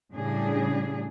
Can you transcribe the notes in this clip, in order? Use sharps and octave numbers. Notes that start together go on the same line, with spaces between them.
A2 C#3 G3 D4 G#4